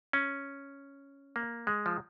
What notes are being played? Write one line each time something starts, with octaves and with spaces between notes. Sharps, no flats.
C#4
A#3
G#3
F3